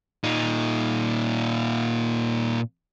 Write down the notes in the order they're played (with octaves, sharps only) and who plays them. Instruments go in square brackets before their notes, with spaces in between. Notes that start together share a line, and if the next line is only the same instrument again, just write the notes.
[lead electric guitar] A#2 D#4